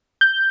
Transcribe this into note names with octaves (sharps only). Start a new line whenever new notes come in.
G6